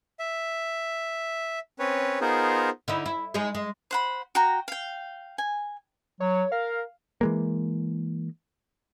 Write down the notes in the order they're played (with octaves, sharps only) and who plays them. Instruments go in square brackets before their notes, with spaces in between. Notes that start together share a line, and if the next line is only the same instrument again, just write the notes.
[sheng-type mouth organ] E5
C4 C#4 B4 C#5
B3 D#4 F4 G#4 A#4 C5
[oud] D3 D#4 E4
E4
G#3 D#4 G#4
G#3
[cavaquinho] C5 F#5 B5
F#4 G5 A#5
F5 G5
G#5
[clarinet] F#3 [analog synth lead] C#5
[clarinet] A#4 [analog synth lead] F5
[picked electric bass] E3 G#3 A#3